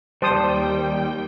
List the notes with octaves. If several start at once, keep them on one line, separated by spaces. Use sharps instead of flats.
D#2 G3 C5 G5 A5 D#6